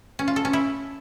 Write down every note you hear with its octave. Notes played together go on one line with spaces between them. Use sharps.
C#4
F4
A4
C#4
E4